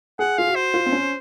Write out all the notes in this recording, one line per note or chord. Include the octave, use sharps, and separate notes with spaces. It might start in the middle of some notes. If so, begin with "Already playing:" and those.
G#4 F#5
F4 F5
F#4
C5
F4
C4
C#4